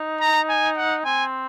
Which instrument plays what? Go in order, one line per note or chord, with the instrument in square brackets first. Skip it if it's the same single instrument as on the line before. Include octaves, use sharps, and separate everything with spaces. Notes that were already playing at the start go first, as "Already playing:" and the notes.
Already playing: [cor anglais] D#4
[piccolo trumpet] A#5
G#5
F#5
[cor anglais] C4 [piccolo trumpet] G#5